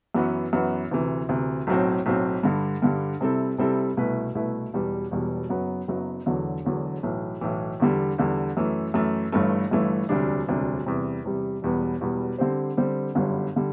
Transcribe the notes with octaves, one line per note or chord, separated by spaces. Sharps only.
F#2 E3 B3 F#4
F#2 E3 B3 F#4
D2 C3 E3
D2 C3 E3
B1 A2 F#3 C4
B1 A2 F#3 C4
G2 D3 G3
G2 D3 G3
C3 G3 C4 E4 A4
C3 G3 C4 E4 A4
C2 B2 A3 E4 B4
C2 B2 A3 E4 B4
E1 E2 B2 G3
E1 E2 B2 G3
F#1 F#2 F#3 B3
F#1 F#2 F#3 B3
E1 E2 D3 F#3
E1 E2 D3 F#3
B1 A2 E3
B1 A2 E3
E2 D3 G3
E2 D3 G3
F#2 E3 A3
F#2 E3 A3
G1 G2 E3 A3
G1 G2 E3 A3
E1 D2 C3 G3 D4
E1 D2 C3 G3 D4
E2 C3 G3
E2 C3 G3
E1 E2 B2 G3 B3
E1 E2 B2 G3 B3
D3 G3 C4 G4 C5
D3 G3 C4 G4 C5
G1 F#2 D3 G3 B3
D3 G3